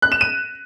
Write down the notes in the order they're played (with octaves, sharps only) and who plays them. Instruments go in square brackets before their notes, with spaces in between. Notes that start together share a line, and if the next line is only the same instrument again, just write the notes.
[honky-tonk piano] F#6
E7
D#7